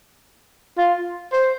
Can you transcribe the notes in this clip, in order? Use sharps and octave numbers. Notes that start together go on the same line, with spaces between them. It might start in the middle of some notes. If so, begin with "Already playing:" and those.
F4
C5